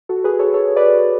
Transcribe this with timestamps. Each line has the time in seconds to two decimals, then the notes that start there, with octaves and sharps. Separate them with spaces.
0.09 F#4 A4
0.24 G#4 B4
0.39 A4 C#5
0.54 A4 C#5
0.76 B4 D5